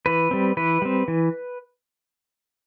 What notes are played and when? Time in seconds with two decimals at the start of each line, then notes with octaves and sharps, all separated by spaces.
0.06 E3 B4
0.31 G3 C4
0.57 E3 B4
0.82 G3 C4
1.08 E3